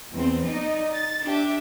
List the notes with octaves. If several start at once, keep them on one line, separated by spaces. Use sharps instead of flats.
E2 C4
D#4 D5
A6
D4 G4 E5